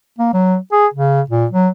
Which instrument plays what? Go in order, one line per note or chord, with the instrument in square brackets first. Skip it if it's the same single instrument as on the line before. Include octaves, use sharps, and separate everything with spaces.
[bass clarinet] A#3
F#3
G#4
C#3
A#2
F#3